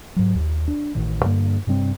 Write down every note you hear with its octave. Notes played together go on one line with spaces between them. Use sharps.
G#2 F#3
D#2
D4
A1 A2 D#3
G2 D3 A#3
G2 C3 G3 C4